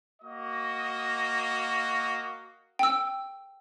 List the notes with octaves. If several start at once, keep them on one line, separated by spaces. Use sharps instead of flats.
A#3 F#4 D#5
G5 E6